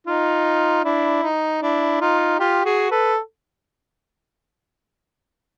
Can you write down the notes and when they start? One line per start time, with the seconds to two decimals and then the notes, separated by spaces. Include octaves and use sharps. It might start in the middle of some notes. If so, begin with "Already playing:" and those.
0.07 D#4 F4
0.85 D4 E4
1.23 D#4
1.62 D4 E4
2.01 D#4 F4
2.39 F4 G4
2.65 F#4 G#4
2.91 A4 B4